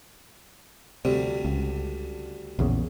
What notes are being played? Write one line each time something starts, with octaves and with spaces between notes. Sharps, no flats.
D2 C3 G3
C#2
A#1 E2 C#3